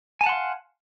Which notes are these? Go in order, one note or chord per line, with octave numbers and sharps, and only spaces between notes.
F5 F#5 G#5 A5 C6